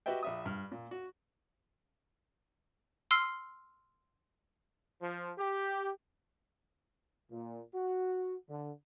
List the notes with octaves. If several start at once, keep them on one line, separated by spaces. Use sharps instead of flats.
F#4 G4 B4 D#5 E5 G5
A#1 E5 D#6
G2 F6
A#2
F#4
C6 E6 F6 C7
F3
G4
A#2
F#4
D3